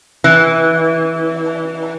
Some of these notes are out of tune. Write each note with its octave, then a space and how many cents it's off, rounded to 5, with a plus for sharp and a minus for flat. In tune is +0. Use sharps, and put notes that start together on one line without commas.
E3 -15